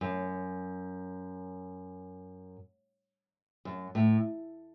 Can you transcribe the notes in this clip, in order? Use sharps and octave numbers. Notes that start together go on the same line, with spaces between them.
F#2
F#2
A2